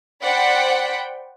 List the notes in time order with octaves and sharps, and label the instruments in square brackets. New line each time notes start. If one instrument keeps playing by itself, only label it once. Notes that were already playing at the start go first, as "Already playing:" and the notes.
[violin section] C5 D5 F#5 G5 B5 B6